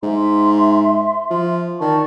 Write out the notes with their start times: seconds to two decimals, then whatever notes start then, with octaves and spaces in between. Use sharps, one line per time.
0.03 G#2 E5 C6
1.30 F3
1.81 D#3 D5 A5 C#6